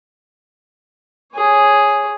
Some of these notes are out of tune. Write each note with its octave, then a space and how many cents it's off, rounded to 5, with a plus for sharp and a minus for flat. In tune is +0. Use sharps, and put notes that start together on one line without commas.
G#4 +0 C#5 +0